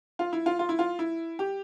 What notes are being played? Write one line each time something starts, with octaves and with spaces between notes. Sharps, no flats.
F4
E4
F4
F4
E4
F4
E4
G4